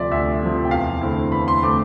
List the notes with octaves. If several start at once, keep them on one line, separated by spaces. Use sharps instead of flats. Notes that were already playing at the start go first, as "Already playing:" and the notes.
Already playing: D2 C3 F3 D5 E5
D2 E5
C3 F3
G5
E2 F5
D3 A3 C4 E4
E2 B5
C6
D3 A3 C4 E4 D6